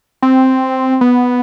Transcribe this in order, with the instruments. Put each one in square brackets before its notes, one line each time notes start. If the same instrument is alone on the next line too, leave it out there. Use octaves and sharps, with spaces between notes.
[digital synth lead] C4
B3